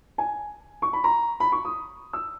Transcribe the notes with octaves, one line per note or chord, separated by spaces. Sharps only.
G#5
C#6
B5
A#5
B5
C#6
D#6
E6